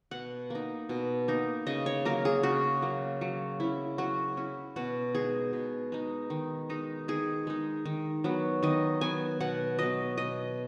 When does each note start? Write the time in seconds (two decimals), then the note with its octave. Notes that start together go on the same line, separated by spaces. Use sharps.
0.11 B2 F#5
0.50 A#3 D#4
0.89 B2
1.28 A#3 D#4
1.67 C#3 D#5
1.86 C#5
2.05 F#3 A#3 A#4
2.25 G#4
2.43 C#3 F#4
2.82 F#3 A#3
3.21 F#3
3.60 C#4 E4
3.98 F#3 F#4
4.37 C#4 E4
4.76 B2 F#4
5.15 G#3 D#4 G#4
5.53 B2
5.92 G#3 D#4
6.30 D#3
6.69 G#3 D#4
7.08 D#3 G#4
7.47 G#3 D#4
7.85 D#3
8.24 F#3 B3
8.63 D#3 D#5
9.01 F#3 B3 G#5
9.40 B2 F#5
9.78 F#3 B3 D#5
10.17 B2 D#5